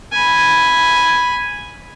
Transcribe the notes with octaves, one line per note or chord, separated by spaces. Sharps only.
G#5 B5